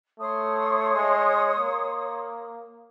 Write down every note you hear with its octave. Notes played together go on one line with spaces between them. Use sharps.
A3 C#5 C6 D#6
G#3
A#3